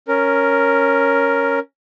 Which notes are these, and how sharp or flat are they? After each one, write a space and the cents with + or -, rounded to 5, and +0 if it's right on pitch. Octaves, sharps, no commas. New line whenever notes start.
C#4 +0 A#4 +0